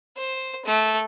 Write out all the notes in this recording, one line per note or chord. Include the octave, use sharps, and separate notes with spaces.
C5
A3